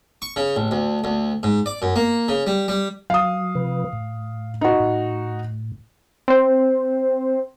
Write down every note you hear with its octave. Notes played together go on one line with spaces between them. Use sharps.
C#6
C#3
A1
D2
D2
G#2
D5
F#2
A#3
C#3
G3
G3
F#3 F5 D#6
C3 F3 B4
A2
D#4 F#4
A2
C4 C5